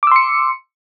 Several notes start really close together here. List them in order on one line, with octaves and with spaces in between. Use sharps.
D6 E6 C6 C#7